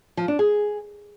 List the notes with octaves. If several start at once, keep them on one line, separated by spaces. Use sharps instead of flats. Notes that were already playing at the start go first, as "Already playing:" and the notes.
F3
D4
G#4